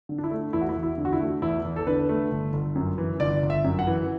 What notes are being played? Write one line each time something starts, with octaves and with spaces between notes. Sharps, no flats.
D3
D4
E4
A3
E2 E4
F#4
E4
E2
E4
D3
F#4
E4
A3
E2 E4
E2
A4
D3 B4
A3
G1
G1
F#2
E3
G1 D5
G1
E5
F#2
F#5
E3